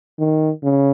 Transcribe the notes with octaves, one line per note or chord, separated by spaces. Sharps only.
D#3
C#3